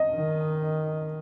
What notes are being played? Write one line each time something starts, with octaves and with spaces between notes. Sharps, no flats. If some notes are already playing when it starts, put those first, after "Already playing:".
Already playing: D#5
D#3